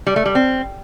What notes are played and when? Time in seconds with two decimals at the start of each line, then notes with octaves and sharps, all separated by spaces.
0.07 G3
0.16 A3
0.26 G3
0.35 C4